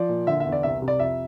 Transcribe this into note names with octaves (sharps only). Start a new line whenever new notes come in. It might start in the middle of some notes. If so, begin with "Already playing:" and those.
Already playing: F3 D5
A#2
D3 E5
E5
E2
D5
C2 E5
C3
D5
F2 E5